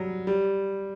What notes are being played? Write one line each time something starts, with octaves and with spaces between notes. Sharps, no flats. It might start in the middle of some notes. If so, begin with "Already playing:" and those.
Already playing: F#3 G3
G3